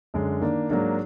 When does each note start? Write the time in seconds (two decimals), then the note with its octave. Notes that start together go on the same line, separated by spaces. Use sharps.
0.14 F#2 D3 G#3 D4
0.41 D#3 A#3 D4
0.69 G#2 F#3 A#3 D4